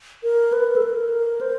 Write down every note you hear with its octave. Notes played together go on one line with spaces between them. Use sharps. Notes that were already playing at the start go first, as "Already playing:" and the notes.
A#4
B4
A4
A#4
C5